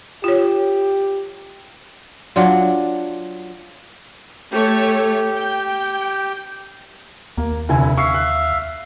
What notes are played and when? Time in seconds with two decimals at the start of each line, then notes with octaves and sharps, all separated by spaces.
0.24 F4 G4 C#5
2.36 F#3 D4 F4
4.52 A3 G4 C#5
5.36 G5
7.37 D#2 A#3
7.69 F1 D3 E4 G#5
7.97 E5 F5 C#6 C7
8.14 F#6